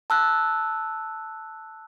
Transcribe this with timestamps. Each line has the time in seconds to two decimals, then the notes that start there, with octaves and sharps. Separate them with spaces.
0.10 A5 E6 F#6